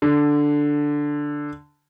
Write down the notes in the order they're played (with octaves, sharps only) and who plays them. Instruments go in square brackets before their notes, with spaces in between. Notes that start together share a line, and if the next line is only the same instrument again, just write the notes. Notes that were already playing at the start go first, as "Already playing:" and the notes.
[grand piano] D3